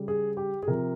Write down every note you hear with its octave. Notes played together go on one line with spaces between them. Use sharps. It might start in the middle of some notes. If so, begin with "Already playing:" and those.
Already playing: C#3 G3
G#4
G4
G#4
C3 F3 A#4